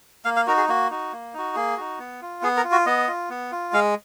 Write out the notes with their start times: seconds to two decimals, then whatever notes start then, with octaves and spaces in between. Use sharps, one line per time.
0.25 A#3 F5
0.36 F5
0.47 D#4 F#4 A#4
0.57 G#4
0.69 A#3 F#4
0.91 D#4 F#4
1.13 A#3
1.34 D#4 F#4
1.55 A#3 G#4
1.77 D#4 F#4
1.99 B3
2.22 F4
2.42 B3 G#4
2.57 A#4
2.64 F4
2.72 F#4
2.86 B3 D#5
3.08 F4
3.30 B3
3.52 F4
3.73 G#3 F5